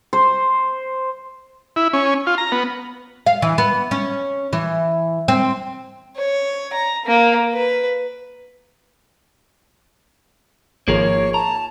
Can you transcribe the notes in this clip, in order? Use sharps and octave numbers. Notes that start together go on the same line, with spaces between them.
C5
E4
C#4
F4
A#5
B3
F5
E3
B3
C#4
E3
C4
C#5
A#5
A#3
B4
G#1 D#3 F3 A#3 G#4 A#4 C#5
A5 A#5